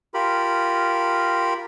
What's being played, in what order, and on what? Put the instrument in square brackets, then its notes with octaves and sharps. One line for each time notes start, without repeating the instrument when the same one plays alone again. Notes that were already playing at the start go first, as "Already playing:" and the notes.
[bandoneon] F4 G4 A#4 B5